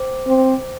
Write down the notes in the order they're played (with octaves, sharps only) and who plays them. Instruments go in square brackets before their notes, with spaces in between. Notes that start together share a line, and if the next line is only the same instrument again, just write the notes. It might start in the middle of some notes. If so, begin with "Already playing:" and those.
Already playing: [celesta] C5 G5 D6
[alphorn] C4